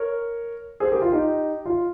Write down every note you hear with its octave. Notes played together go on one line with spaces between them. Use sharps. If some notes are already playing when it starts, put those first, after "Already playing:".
Already playing: A#4 C#5
G#4 C5
G4 A#4
F4
D#4 G4
F4